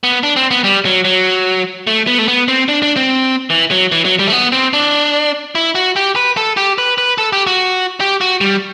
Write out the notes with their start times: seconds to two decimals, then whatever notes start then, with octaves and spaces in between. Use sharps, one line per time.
0.04 B3
0.23 D4
0.36 C4
0.51 B3
0.64 G3
0.85 F#3
1.05 F#3
1.87 A3
2.07 B3
2.18 A3
2.28 B3
2.48 C4
2.68 D4
2.82 D4
2.96 C4
3.50 E3
3.71 F#3
3.92 E3
4.05 F#3
4.19 G3
4.27 A3
4.32 B3
4.52 C4
4.73 D4
5.55 E4
5.75 F#4
5.96 G4
6.16 B4
6.37 A4
6.57 G4
6.78 B4
6.98 B4
7.18 A4
7.33 G4
7.47 F#4
8.00 G4
8.21 F#4
8.41 G3